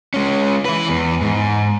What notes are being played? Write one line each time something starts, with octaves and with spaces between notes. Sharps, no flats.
G#3 C#4
E3 B4
E2
G#2